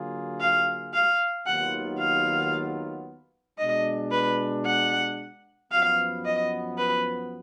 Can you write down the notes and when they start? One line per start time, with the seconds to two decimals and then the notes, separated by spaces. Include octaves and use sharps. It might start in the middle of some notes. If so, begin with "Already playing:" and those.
Already playing: D3 F#3 A#3 F4 G#4
0.40 F5
0.93 F5
1.46 D#2 D#3 F#3 B3 F4 F#5
1.99 F5
3.59 B2 G#3 D4 D#5
4.11 B4
4.65 F#5
5.71 F#2 F3 B3 F5
6.25 D#5
6.78 B4